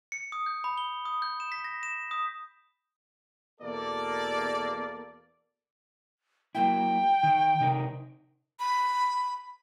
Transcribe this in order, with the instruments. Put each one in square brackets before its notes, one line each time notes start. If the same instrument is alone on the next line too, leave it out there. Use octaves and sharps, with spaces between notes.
[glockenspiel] C#7
D#6
G6
B5
G7
D#6
G6
E7
B6
A#6
E7
D#6
[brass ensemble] E2 B2 A#3 A4 D5
[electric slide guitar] F#3 A#3 E4 [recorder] G5
[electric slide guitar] D#3
C3 D#4 A#4
[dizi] B5